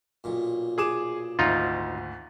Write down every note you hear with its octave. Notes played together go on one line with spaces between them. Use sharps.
B1 A#2
G#4 D6 E7
G#1 D2 D#4 F4